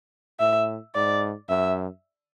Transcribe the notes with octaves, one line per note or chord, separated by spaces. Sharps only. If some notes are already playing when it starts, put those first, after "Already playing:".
A2 E5
G#2 D5
F#2 E5